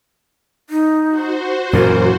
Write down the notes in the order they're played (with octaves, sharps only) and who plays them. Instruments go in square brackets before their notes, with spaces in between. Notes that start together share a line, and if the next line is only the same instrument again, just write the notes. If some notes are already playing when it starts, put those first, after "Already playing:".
[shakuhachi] D#4
[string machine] F#4 C5
[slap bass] F#2 A#2 E3 [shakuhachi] A#4